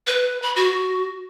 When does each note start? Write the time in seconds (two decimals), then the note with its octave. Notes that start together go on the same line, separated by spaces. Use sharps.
0.07 B4
0.42 B5
0.56 F#4